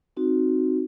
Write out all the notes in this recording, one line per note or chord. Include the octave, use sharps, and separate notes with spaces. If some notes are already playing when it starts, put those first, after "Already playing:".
C4 D#4 F#4